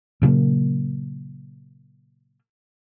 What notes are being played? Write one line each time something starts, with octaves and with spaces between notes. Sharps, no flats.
A#2 C#3 F#3 A#3